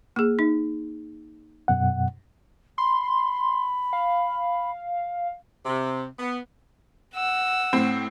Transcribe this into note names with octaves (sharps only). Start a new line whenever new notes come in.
A#3 G#4
D#4
F#2 B2 F#5
B5 C6
F5
C3
B3
F#5 E6
A2 C4